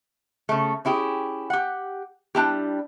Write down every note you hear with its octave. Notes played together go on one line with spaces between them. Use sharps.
C#3 A3
C#4 E4 G4 G#4
G4 F#5
G3 D4 E4 G4